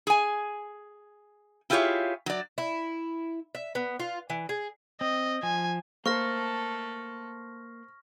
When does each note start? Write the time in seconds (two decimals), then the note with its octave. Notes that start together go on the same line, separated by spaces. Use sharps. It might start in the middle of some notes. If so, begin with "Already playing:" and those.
0.07 G#4 G#5
1.70 E4 F4 G4 G#4 C#5 F5
2.26 F#3 D5
2.58 E4
3.55 E5
3.75 B3
4.00 F4
4.30 E3
4.49 G#4
5.01 C4 D#5
5.43 F3 G#5
6.06 A3 A#3 A4 C5 C#6 F6 A#6